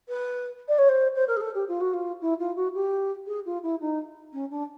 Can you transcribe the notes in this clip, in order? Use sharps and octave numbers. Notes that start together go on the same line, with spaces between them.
B4
D5
C#5
C5
C5
A#4
G#4
A4
G4
F4
F#4
F4
E4
F4
F#4
G4
G#4
F4
E4
D#4
C#4
D4